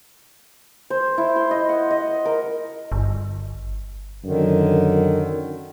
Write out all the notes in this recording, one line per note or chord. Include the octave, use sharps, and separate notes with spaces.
C5
E4
C6
D#5
F#5
D#5
A#4
G1
F#2 D3 D#3